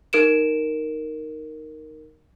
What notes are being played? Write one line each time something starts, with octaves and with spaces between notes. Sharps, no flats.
D#4 A#4 D7 E7